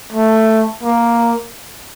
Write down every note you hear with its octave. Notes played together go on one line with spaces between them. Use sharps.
A3
A#3